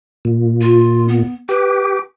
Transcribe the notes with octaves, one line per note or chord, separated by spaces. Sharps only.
A#2
F4
B3
G4 B4